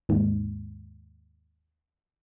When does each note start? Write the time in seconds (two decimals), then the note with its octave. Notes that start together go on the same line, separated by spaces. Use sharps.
0.09 D#2 G#2